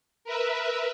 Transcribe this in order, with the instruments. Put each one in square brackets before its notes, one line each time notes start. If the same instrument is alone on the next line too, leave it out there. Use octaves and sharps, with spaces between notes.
[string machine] A#4 B4 E5